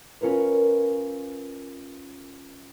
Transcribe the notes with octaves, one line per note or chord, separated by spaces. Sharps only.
C#4 F4 A#4 B4